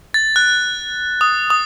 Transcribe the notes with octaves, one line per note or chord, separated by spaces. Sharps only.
A6
F#6
D#6
D#6